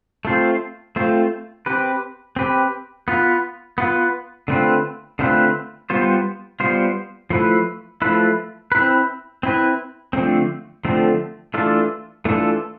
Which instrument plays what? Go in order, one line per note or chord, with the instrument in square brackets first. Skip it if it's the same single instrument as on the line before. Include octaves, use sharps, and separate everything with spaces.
[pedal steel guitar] A3 C4 F4 C5
A3 C4 F4 C5
C4 G4 B4
C4 G4 B4
B3 F4 B4
B3 F4 B4
D3 A3 C4 F4 B4
D3 A3 C4 F4 B4
G3 B3 F4 C5
G3 B3 F4 C5
F3 A3 E4 B4
F3 A3 E4 B4
C4 E4 B4
C4 E4 B4
D3 F3 A3 C4
D3 F3 A3 C4
E3 A3 D4 F4 A4
E3 A3 D4 F4 A4